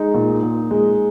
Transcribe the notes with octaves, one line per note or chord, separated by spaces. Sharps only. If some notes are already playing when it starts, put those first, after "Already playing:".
Already playing: G#3 D#4
A#2
A#2
G#3